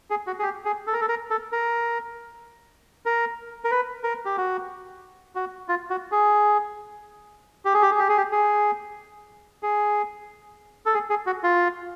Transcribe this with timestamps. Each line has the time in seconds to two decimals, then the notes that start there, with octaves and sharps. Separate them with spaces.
0.10 G#4
0.27 F#4
0.39 G#4
0.43 G4
0.65 G#4
0.87 A4
0.93 A#4
1.01 A4
1.08 A#4
1.30 A4
1.52 A#4
3.06 A#4
3.64 A#4
3.71 B4
4.04 A#4
4.25 G4
4.37 F#4
5.35 F#4
5.68 F4
5.90 F#4
6.12 G#4
7.65 G4
7.74 G#4
7.82 G4
7.91 G#4
7.99 G4
8.09 G#4
8.17 G4
8.32 G#4
9.63 G#4
10.86 A4
10.94 G#4
11.10 G#4
11.26 F#4
11.44 F4